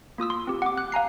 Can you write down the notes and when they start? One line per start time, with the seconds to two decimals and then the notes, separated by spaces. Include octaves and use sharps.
0.18 A#3 F4 D#6 E6
0.30 C6
0.47 C4 G4
0.62 F#5 D6
0.78 F#6
0.92 F5 G#5 A#5 C7